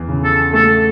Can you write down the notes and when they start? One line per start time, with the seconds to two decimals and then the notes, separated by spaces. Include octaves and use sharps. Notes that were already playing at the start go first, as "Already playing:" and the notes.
Already playing: E2
0.09 C#3
0.24 A4
0.53 A3 A4